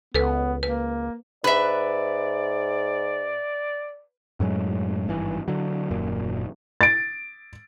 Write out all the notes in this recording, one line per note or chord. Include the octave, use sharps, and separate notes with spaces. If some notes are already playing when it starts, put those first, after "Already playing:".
C#2 B3 A4 B4
A#3 B4
G#2 B4 D5 E5 F#6
F#2 A2 F#3 G#3
G#1 G2 E3
D3 F#3
D#1 F#2 A#2
A6 D7